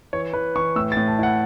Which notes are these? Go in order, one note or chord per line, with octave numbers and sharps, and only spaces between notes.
E3 C#5
E3 B4
E3 C#6
A2 E6
A6
A2
A5
E4 F#5